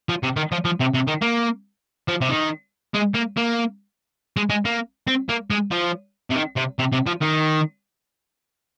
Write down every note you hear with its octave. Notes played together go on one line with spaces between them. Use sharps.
F3
C3
D#3
F3
F3
C3
C3
D#3
A#3
F3
C3
D#3
G#3
A#3
A#3
G#3
G#3
A#3
C4
A#3
G#3
F3
C3
D#3
C3
C3
C3
F3
D#3